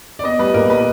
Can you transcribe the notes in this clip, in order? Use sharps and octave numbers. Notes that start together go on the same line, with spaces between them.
D5
B3 D#5
G3 B4
A#2 A#4
B4